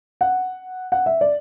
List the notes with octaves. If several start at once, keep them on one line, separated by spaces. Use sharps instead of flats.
F#5
F#5
E5
D5